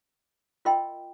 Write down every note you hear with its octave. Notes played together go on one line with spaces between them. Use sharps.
F4 A#4 D#5 G5 C6